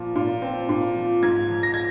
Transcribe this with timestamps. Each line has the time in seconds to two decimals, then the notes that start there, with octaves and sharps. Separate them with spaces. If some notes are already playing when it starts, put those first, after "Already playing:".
Already playing: A#2 F3
0.15 A#2
0.42 C4
0.69 A#2
0.96 F3
1.23 G#2 G#6
1.49 F3
1.63 A#6
1.74 G#6